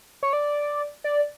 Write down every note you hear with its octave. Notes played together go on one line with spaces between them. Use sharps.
C#5
D5
D5